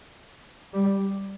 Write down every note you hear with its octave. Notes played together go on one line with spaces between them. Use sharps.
G3